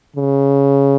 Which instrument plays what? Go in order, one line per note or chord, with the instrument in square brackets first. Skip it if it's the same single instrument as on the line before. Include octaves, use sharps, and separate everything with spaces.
[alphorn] C#3